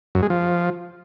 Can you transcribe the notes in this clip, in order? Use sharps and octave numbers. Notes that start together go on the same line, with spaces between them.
F#2
G#3
F3